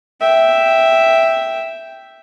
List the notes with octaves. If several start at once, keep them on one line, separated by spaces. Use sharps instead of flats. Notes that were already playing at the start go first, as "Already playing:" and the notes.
E5 G5